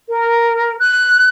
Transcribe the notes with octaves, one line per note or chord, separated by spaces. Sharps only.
A#4
F#6